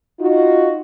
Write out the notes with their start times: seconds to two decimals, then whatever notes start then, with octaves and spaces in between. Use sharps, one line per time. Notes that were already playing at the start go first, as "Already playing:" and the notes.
0.20 D#4 F4 F#4